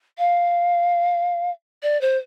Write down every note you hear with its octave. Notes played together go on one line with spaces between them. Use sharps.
F5
D5
C5